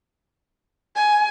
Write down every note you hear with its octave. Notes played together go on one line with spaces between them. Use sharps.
G#5